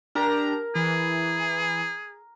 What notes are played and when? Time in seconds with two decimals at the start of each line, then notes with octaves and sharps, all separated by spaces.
0.15 D4 G4 A#4 A#5
0.75 E3 G#4